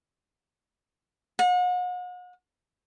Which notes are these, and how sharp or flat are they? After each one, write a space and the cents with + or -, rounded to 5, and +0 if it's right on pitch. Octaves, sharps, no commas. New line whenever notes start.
F#5 -40